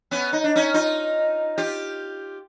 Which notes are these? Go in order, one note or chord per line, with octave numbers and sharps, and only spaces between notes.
B3 C#4
D#4
D4
C#4 D#4
D#4 F4
F4 G4